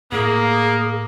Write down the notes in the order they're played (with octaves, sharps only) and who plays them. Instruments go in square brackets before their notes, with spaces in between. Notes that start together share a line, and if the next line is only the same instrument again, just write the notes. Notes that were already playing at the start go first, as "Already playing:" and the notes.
[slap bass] A2 [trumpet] A#3 [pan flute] G#4